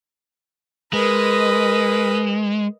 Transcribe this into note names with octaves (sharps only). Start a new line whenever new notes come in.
G#3 A#4 B4 D#5